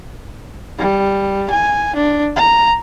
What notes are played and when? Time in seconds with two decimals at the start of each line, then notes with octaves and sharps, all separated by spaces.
0.79 G3
1.50 G#5
1.96 D4
2.36 A#5